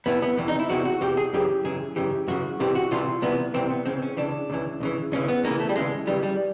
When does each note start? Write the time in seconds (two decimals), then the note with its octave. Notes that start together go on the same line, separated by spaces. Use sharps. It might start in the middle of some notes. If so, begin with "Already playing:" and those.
0.06 E2 C3 E3 B3
0.22 B3
0.38 E2 C3 E3
0.48 D#4
0.59 E4
0.70 E2 C3 E3 F#4
0.85 F#4
1.01 E2 C3 E3 G4
1.17 G#4
1.33 F#2 C#3 E3 G4
1.64 F#2 C#3 E3 G#4
1.96 F#2 C#3 E3 G4
2.28 F#2 C#3 E3 F#4
2.60 C2 C3 E3 G4
2.75 F#4
2.91 C2 C3 E3 F4
3.22 C2 C3 E3 B3
3.54 C2 C3 E3 C4
3.70 B3
3.86 C#2 C#3 E3 C4
4.02 C#4
4.17 C#2 C#3 E3 D4
4.50 C#2 C#3 E3
4.80 C#2 C#3 E3
5.12 D#2 C#3 E3 C#4
5.28 B3
5.44 D#2 C#3 E3 A#3
5.60 A3
5.69 G3
5.76 D#2 C#3 E3 G#3
6.07 D#2 C#3 E3 G3
6.23 G3